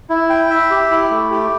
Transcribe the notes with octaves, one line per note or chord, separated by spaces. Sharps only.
E4
G5
E5
G4
E4
A3
G4